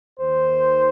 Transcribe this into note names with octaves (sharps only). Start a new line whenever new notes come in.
D#2 D#3 C5